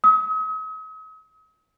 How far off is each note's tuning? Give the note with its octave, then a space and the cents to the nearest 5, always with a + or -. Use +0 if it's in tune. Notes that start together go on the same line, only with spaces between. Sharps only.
D#6 +45